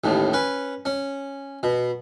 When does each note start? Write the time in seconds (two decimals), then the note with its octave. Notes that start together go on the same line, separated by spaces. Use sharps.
0.04 A1 D#2 A2
0.33 C#4 B4
0.85 C#4
1.63 B2